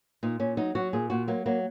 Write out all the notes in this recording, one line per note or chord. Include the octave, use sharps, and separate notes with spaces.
A#2 D#4
A#2 C#4
F#3 D#4
F#3 F#4
A#2 G#4
A#2 F#4
F#3 A#3
F#3 A#3